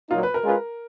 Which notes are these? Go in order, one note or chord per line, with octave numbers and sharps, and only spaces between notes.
A#2 F#3 A#3 D#4 F4
B4
A#4
G#3 C#4 F4 G#4 B4